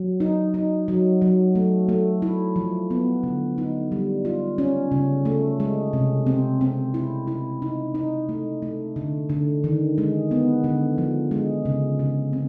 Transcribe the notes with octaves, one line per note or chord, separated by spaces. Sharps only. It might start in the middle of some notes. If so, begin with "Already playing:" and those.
Already playing: F#3
D#4
D#4
F#3
F#3
A3
A3
E4
F3
B3
D3
D#4
G3
F4
C#4
C#3
A3
G#3
C3
C4
C4
E4
E4
D#4
D#4
A3
A3
D3
D3
D#3
G#3
B3
D3
F3
G#3
C#3
C#3
C4